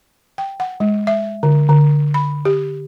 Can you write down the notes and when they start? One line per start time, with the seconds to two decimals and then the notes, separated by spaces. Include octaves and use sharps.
0.38 G5
0.60 F#5
0.80 G#3
1.07 E5
1.43 D3
1.69 D3
2.14 B5
2.45 G4